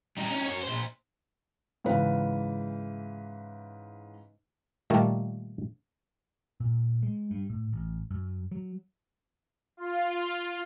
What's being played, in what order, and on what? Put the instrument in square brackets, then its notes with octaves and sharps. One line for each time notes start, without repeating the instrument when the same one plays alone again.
[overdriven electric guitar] G3 D#4
C#4 D#4
F#2 C#5
A#2 C5
[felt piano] G#2 C#3 E3 B4
[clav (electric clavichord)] A#2 D#3 G3 A3 A#3 D5
[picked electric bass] A#2
G#3
G2
A2
A1
F#2
F#3
[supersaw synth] F4